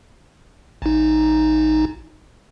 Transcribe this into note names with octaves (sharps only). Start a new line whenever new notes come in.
A1 D#4